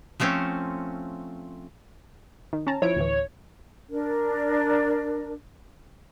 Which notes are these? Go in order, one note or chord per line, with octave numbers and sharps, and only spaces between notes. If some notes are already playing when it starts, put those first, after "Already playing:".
F3 A3 C4 C#4 C5
D#3
C#4 A5 A#5
F3 E4 C#5 D7
D2 A2 E3
D4 A#4